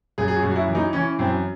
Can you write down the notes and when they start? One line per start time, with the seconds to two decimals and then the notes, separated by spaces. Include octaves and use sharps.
0.18 F#2 G#4
0.28 G#4
0.36 F#4
0.43 F#2
0.51 F#4
0.56 E4
0.68 E3
0.75 D#4
0.93 E3 C#4
1.19 F#2 C4